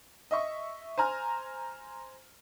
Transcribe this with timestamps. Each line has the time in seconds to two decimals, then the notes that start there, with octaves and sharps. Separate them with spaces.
0.31 D#5 E5 C#6
0.98 C5 G#5 A#5 F6